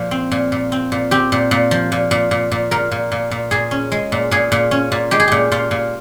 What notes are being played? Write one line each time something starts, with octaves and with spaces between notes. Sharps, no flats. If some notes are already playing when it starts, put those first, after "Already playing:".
Already playing: A#2 F3
C4
A#2
A#2
C4
A#2
C4 G4
A#2
A#2
F3
A#2
A#2
A#2
A#2
A#2 A#4
A#2
A#2
A#2
A#2 G#4
C#4
G#3
A#2
A#2 G#4
A#2
C#4
A#2
G#3 G4
G#4
A#2 G4
A#2 F4
A#2